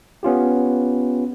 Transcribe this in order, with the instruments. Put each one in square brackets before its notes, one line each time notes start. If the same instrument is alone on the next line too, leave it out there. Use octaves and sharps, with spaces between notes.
[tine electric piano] B3 C#4 F4 G4